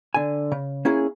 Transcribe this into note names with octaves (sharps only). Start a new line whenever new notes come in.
D3 G#5
C#3
A#3 C#4 E4 G#4